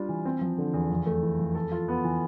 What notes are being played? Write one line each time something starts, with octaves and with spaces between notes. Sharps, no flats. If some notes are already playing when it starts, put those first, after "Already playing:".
Already playing: G3 D4 F4
E3
C4
F3
D3
E2
F2
A3
E3
F2
A4
F4
B3
E3